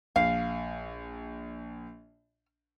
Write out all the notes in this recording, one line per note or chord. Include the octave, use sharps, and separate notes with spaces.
A#1 F5